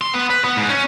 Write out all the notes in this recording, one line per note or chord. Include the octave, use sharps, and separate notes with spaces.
C6
B3
B4
B3
G#2
C#4